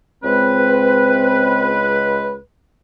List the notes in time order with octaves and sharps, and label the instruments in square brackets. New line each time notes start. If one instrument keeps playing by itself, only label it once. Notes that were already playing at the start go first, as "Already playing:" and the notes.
[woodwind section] C#2 G#3 B4 [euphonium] C4